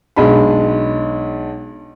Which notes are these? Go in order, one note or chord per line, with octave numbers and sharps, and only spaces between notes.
B1 G#3 D4 B5